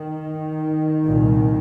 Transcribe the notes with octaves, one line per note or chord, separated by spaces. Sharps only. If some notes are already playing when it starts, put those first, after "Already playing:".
Already playing: D#3
C2 A#2